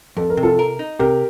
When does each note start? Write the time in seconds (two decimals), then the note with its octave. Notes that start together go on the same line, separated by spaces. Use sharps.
0.17 F2 A4
0.30 A#4
0.37 C3
0.43 F4 A4
0.59 A#4
0.79 D#4
0.99 C3 G4 A#4